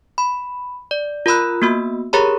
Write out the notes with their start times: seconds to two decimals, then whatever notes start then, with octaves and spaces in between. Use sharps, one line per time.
0.18 B5
0.91 D5
1.26 F4 A#4 A#5 B5 E6 F#6
1.62 A#3 B3 F#4 E6
2.13 G4 G#4 A#4 C#5 A#5 B5